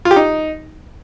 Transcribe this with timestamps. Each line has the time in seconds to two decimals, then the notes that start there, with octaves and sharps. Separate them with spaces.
0.05 F4
0.11 G4
0.16 D#4